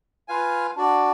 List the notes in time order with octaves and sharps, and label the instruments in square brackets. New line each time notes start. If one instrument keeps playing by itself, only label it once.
[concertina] F4 B4 F5 G#5
D4 F#4 D5